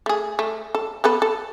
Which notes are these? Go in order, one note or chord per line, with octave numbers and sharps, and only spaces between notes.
A3 G#4
A3
A4
B3 A4 B4
A4